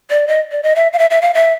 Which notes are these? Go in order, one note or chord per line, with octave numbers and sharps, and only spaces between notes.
D5
D#5
D5
D#5
E5
F5
E5
E5
F5
E5